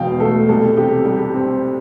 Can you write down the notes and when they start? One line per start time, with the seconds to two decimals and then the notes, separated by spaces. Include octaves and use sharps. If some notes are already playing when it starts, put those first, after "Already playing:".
Already playing: E1 E2 B2 F5 G5
0.20 A3 A4
0.49 C2 A4
0.77 C3 G4
1.05 G3 G4
1.34 C4